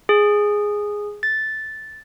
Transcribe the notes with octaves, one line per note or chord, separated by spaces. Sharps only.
G#4
A6